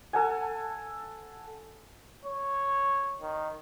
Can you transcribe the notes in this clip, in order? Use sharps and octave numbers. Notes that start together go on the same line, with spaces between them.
A4 F#5 G#5
C#5
D#3